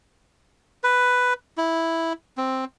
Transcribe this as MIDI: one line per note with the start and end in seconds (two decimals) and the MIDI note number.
0.84 1.33 71
1.58 2.13 64
2.37 2.65 60